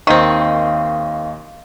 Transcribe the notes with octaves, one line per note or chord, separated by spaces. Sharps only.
D#2 D#3 C4 D#5 F5 C#6